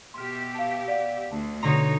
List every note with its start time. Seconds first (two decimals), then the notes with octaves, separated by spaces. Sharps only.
0.14 B2 G4 E5 C6 F6
0.55 F5 A5
0.88 D5 F5 F#5
1.31 D2 A5
1.63 B2 D3 D#4 C#5 A#5 C6